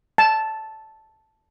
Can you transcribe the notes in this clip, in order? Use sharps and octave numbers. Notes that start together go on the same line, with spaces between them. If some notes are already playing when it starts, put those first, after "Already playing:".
A5